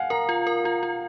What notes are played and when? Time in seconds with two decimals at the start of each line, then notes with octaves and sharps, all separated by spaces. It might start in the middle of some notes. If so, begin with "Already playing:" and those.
Already playing: F5 F#5 G#5
0.10 A#4 A#5
0.29 F4
0.47 A#4
0.64 F4 A#5
0.83 F4